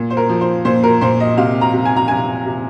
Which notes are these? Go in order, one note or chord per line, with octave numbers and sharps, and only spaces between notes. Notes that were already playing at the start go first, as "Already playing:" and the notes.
Already playing: A#2
C5
A#4
F3
C5
A#2 C5
A#4
A#2 C5
D#5
C3 F5
A#5
C3
G#5
A#5
C3 G#5
C3